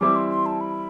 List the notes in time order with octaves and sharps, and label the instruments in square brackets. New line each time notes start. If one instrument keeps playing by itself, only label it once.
[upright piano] E3 G3 C4 E4 [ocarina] D6
[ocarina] C6
C6
A5
B5